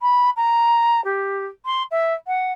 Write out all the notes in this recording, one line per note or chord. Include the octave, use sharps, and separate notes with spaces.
B5
A#5
G4
C6
E5
F#5